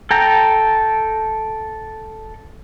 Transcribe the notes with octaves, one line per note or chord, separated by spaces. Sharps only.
A4 G5 A#5